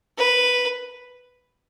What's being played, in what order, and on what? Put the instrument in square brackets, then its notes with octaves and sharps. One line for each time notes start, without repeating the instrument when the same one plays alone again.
[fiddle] B4